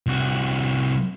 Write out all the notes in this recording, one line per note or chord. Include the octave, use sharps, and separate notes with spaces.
C2 F#4